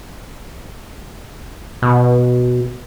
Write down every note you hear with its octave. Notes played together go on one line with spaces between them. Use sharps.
B2